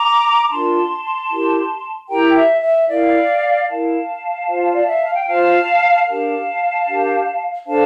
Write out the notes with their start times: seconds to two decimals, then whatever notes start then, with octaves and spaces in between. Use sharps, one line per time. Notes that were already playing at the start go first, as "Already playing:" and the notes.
Already playing: A#5 D6
0.49 D4 F4 A#4 A5 C6
1.30 E4 G4 A#4
2.09 E4 G4 A#4 G5 A#5
2.35 E5
2.62 E5
2.88 E4 A#4 D5 F5
3.68 E4 A#4 F5 A5
4.48 F4 C5
4.74 D5
4.87 E5
5.00 F5
5.14 G5
5.27 F4 C5 F5 A5
6.06 D4 G4 A#4 F5 A5
6.86 D4 G4 A#4
7.66 D4 A4 C5 F5 A5